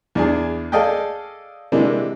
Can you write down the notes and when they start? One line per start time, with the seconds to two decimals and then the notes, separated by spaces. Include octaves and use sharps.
0.15 E2 D4 G#4
0.72 G#4 A4 D5 D#5 F5 G5
1.72 C3 E3 G#3 A#3 D4